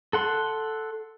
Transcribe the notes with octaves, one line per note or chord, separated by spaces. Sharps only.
A4 F#5 C6